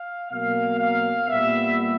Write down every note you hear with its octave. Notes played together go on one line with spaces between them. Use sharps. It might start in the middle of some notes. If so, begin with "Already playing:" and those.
Already playing: F5
B2 F#3 A#3 F5
F5
A#2 G3 B3 E5